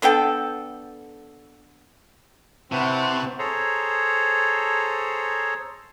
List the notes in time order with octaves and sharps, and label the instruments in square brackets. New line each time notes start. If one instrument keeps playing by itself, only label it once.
[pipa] D3 B3 A4 G5
[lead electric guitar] C3 [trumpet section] C4 E4 F#5 [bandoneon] B4 C5 A5 [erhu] C#6
[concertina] G#4 A4 C5 C#5 A#5